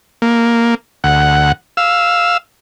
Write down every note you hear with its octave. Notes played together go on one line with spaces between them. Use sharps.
A#3
D2 F#5
F5 E6